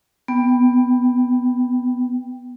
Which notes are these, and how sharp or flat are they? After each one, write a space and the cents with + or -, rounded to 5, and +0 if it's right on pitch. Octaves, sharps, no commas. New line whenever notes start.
B3 +0 G5 +0